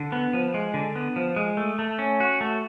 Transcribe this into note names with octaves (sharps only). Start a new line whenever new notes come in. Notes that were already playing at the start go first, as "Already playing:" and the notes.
Already playing: D3
B3
F3
G#3
D3
B3
F3
G#3
A3
A3
C#4
F#4
A3